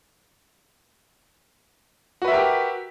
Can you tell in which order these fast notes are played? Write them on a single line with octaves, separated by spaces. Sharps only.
F#4 B4 E5 A#4 G4